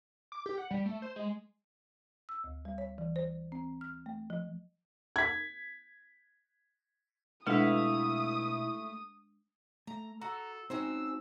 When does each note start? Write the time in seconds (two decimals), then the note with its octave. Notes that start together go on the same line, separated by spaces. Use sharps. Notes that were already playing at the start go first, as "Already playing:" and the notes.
0.32 D6
0.46 G4
0.58 F#5
0.71 G3
0.86 A3
1.02 C5
1.16 G#3
2.29 E6
2.44 D2
2.65 G3
2.78 C#5
2.98 E3
3.16 C5
3.52 C4
3.81 F6
4.06 A3
4.30 F3
5.16 G#6 B6
7.47 B2 G#3 A3 D4 E4 A4 F5 D#6
9.87 A3 A#5
10.21 F#4 A4 A#5
10.70 C4 C#4 D#4 F#4 C5 E6